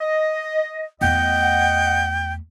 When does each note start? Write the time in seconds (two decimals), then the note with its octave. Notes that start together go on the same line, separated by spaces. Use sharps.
0.01 D#5
1.01 E2 A3 D#5 F#5 G5